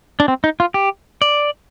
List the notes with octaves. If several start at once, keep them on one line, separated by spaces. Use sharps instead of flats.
D4
C4
D#4
F4
G4
D5